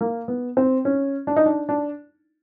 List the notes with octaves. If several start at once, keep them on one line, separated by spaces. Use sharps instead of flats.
A#3
B3
C4
C#4
D4
D#4
D4
D4